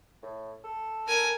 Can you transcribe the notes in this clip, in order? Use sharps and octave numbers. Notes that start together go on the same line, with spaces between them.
A2
A4
A#4 G#5